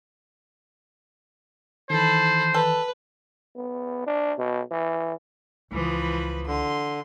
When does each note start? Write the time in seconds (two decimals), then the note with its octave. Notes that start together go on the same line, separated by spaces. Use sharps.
1.90 D#3 E3 A4 C5 B5
2.54 A4 B4
3.56 B3
4.06 D4
4.39 B2
4.71 E3
5.71 C#2 E3 F3 D#4 B4
6.47 D3 C6